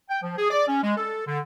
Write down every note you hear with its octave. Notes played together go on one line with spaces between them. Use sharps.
G5
F3
G#4
D5
C#4
G#3
A4
D3